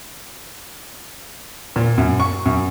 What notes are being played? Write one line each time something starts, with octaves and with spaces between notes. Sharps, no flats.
A#2
F#2
C#6
F#2